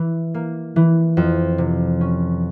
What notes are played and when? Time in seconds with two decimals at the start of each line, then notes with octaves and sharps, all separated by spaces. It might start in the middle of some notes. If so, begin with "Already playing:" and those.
Already playing: E3
0.34 A#3
0.76 E3
1.17 F2
1.58 C3
2.01 C#4